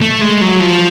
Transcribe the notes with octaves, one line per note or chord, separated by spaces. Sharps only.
A3
G#3
F#3
F3